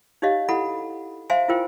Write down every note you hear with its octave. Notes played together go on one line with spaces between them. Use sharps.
D#4 G4 C#5 D#5 F5
E4 A4 F#5 B5
C5 E5 F5 G#5 A#5 C6
E4 F4 A#4 C5 G5